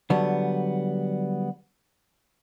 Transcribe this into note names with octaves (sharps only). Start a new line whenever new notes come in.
D3 F#3 G3 B3